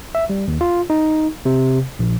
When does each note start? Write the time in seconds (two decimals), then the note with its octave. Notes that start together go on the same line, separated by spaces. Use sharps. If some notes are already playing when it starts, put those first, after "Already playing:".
0.15 E5
0.30 G3
0.48 D#2
0.61 F4
0.90 D#4
1.46 C3
1.99 A#1